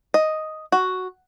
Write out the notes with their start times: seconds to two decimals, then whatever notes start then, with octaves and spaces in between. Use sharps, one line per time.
0.14 D#5
0.72 F#4